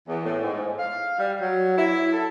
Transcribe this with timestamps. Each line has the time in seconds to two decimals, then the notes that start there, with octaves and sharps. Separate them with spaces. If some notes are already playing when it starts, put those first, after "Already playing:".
0.09 E2
0.25 A2
0.42 G#2
0.79 F5
1.18 G3
1.42 F#3
1.78 E4
2.12 A4